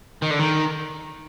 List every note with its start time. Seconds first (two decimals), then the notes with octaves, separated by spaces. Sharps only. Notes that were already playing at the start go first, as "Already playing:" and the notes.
0.22 D#3
0.30 D3
0.39 D#3